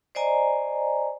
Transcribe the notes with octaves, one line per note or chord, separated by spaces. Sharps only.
C5 D5 D#5 G#5 A#5